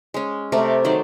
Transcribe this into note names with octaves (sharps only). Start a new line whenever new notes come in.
G#3 C#4
C3 A3 A#4 D5
D#3 F#3 C5 D5